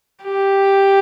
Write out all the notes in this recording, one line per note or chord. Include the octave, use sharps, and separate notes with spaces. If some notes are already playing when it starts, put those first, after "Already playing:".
G4